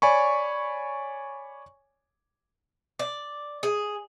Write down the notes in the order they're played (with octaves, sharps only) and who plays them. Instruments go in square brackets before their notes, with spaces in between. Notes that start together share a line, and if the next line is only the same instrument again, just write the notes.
[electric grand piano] C#5 D5 G#5 B5 C#6
[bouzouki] D5
G#4